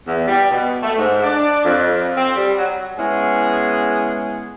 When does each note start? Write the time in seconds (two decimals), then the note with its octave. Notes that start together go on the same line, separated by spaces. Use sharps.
0.07 E2
0.28 G3
0.51 B2
0.83 A3
0.98 G#2
1.23 D4
1.65 F2
2.17 C4
2.36 G3
2.57 F#3
2.98 G#3 B3 C#4 E4 G#4